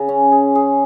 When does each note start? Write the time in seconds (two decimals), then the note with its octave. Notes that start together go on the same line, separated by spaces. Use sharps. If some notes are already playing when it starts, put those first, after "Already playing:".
Already playing: C#3
0.09 C#4
0.32 G#4
0.55 G#4